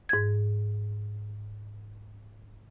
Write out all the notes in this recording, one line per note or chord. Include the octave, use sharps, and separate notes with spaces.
G#2 G#6